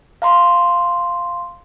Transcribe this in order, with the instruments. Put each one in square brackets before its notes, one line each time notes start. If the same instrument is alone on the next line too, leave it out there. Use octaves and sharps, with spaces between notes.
[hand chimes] F5 A#5 C6